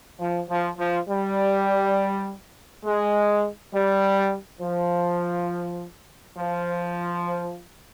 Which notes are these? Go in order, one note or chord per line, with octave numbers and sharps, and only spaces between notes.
F3
F3
F3
G3
G#3
G3
F3
F3